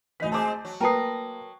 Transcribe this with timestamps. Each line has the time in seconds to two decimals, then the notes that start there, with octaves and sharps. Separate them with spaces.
0.20 D2 E3 D#4 D#5 B6
0.32 G#3 C4 C5 A5 D6
0.65 F#3
0.81 A#3 A#4 B4 G5 A5 D#6 C7